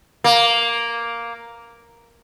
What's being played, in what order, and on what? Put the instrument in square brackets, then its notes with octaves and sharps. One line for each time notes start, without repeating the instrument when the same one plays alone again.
[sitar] A#3